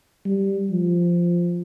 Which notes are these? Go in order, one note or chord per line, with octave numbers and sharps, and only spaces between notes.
G3
F3